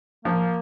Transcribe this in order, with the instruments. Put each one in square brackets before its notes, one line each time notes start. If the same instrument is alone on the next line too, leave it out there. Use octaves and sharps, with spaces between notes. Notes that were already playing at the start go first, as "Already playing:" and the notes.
[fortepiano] F3 [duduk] A#3